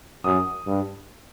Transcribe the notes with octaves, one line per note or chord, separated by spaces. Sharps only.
F#2 D#6
G2